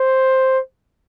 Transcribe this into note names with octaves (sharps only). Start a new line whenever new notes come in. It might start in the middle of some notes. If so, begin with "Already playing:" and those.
Already playing: C5